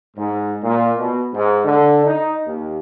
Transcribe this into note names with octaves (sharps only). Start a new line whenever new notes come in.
G#2
A#2
B2
G#2
D3
D#4
D#2